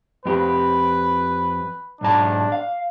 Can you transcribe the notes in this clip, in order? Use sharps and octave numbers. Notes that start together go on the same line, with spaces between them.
F2 G4 B4
B1 G#2 D4 A5
F5